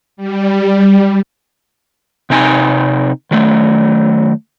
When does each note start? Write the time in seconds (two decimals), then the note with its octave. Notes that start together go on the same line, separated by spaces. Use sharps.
0.17 G3
2.30 C3 C4 D#4 G#5
3.31 D#3 F#3 A3